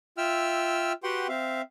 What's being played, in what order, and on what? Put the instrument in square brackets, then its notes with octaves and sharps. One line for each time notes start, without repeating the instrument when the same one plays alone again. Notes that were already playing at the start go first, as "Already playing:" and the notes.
[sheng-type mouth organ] F4 E5 G5 E6 F6
F#4 G4 B4 F#5 G5 C6
C4 E5 F5